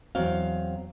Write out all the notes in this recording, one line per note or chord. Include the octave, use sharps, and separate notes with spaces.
E2 F#3 C4 F5